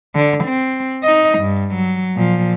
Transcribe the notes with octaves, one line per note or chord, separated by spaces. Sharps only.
D3
C4
D#4 D#5
G2
F#3
A#2 F3